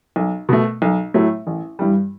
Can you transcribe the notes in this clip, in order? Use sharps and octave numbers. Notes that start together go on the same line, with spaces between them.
B1
B2 A3
B1
A2 F#3 A3
A1
G2 E3 G3